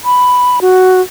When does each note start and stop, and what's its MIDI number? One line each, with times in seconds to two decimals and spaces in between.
0.04 0.59 83
0.61 1.01 66